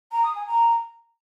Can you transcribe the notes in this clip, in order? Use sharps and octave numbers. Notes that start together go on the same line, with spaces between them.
A#5
D#6
G#5
A#5